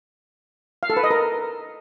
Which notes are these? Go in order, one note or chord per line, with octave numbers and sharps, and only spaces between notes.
F5
A4
B4
D#5
A#4